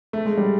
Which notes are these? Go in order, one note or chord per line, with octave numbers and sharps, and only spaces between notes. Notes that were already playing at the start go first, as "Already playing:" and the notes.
A3
G#3
G3